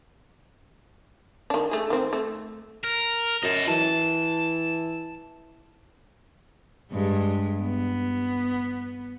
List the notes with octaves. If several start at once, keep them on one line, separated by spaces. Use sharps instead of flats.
D#3 D4
A3 G#4
D#3 C4
A3
A#4
F#2 D#5 A5
E3 A5
G2 G#3
B3